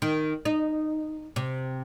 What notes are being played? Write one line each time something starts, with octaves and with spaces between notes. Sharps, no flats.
D#3
D#4
C3